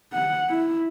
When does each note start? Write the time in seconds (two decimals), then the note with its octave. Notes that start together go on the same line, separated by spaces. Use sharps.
0.13 F#5
0.49 E4